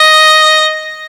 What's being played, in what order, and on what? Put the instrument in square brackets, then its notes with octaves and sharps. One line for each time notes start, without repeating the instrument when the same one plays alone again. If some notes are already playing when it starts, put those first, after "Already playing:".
Already playing: [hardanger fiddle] D#5